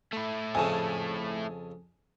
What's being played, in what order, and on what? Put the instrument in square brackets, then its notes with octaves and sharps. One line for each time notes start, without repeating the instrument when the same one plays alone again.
[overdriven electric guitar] A3 E4
[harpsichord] F2 C#3 [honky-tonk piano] G#5 A5